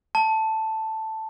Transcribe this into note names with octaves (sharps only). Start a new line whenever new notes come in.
A5